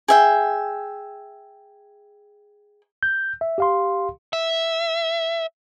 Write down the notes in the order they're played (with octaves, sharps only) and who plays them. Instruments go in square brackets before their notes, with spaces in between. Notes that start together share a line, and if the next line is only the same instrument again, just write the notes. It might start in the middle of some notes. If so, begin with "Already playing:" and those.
[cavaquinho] G#4 E5 G5
[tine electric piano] G6
E5
G4 F5 C6
[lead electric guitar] E5